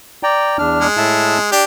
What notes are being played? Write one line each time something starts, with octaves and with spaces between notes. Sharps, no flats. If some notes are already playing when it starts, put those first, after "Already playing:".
D5 G5 A#5
E2 D4 F6
G#3
A2 E5 A5
D4 G4